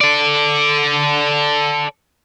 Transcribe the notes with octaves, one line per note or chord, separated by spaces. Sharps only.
A4 D5